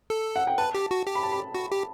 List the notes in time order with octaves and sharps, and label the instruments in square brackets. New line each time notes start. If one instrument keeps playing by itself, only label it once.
[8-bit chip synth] A4
[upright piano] F#5
G5
[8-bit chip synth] B4 [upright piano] A5
[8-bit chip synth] G4
F#4
G4
[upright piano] B5
A5
B5
[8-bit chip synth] F#4
G4